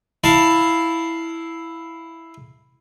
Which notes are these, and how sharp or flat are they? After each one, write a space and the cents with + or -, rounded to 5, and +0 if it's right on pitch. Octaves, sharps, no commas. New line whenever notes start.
E4 +0 F5 +0 A5 +15